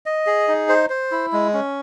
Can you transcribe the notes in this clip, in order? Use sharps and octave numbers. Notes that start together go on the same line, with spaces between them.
D#5
G#4
D#4
C5
C5
E4
G#3
C#4